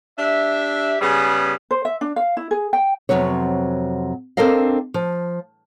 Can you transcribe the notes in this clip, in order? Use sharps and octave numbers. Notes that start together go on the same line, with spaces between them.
D4 G4 E5
C#3 G3 B3 G#4
C5
E5
D4
F5
E4
G#4
G5
F2 C3 F#3 B3 C#5
C4 D4 A4 A#4 D#5 F5
F3